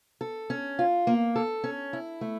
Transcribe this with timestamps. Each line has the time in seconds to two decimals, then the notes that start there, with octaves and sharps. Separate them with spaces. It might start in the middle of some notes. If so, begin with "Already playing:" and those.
0.21 A4
0.50 C#4
0.79 F4
1.07 A#3
1.36 A4
1.64 C#4
1.93 E4
2.21 A3